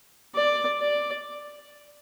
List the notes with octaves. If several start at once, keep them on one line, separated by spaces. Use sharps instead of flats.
D5
D5